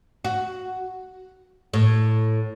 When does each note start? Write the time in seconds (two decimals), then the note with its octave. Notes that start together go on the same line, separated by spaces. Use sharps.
0.24 F#4
1.73 A2